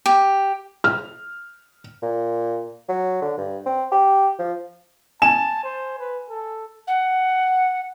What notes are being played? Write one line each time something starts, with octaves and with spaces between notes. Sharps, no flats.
G4
F6
A#2
F#3
D3
G2
C4
G4
F3
G#5 A5 E7
C5
B4
A4
F#5